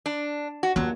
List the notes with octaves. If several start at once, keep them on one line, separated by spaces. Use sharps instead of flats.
D4
F#4
D#2 F#3 F4